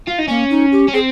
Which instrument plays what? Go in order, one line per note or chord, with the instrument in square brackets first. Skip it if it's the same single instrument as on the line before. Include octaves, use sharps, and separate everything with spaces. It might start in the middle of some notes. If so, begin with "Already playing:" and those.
[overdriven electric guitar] F4
D#4
[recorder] A#3 [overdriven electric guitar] C#4
[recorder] D#4
G4
[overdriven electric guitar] C#4
[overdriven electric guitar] C4 [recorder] G#4